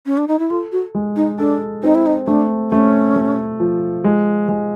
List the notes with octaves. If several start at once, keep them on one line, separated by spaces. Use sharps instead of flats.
C#4
D4
D#4
E4
F4 A4
F#4
G#3
D#4
D4 A4
C4 D#4
E4
D#4
A3 D4
A3 C#4
A3
F3
G#3
G#3